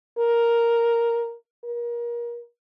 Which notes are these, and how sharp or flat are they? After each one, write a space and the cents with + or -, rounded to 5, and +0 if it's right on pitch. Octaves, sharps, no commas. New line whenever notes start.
A#4 +0
A#4 +30